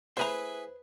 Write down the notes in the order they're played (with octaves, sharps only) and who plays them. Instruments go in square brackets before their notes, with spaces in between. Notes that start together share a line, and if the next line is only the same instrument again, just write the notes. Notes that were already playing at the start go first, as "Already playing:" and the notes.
[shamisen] A3 A#5 [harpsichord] E4 G#4 E5 [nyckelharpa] B4 [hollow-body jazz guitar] C5 B5